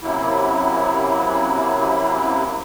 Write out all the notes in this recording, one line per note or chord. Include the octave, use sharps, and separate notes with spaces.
F#2 C3 F#3 A#3 E4